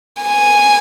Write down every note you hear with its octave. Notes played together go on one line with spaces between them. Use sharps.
G#5